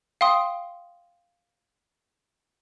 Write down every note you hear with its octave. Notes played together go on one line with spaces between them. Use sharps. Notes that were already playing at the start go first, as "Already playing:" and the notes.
F5 G5 C6 D#6